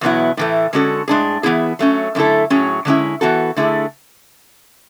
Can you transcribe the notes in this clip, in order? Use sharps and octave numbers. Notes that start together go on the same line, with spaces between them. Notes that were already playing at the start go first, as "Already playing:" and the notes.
E2 B2 F#3 B3 E4
A2 E3 A3
D3 G#3 C#4 F#4 A4
A2 G#3 D4 G#4
E3 B3 E4 G#4
F#3 A3 C#4
F#2 D3 A3 E4 A4
A2 F#3 C#4 G#4
D3 G#3 C#4 E4
E3 B3 F#4 A4
D3 A3 E4 G#4